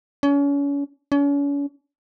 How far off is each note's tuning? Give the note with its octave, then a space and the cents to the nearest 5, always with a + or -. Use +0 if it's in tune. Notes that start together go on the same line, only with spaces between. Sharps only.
C#4 +35
C#4 +40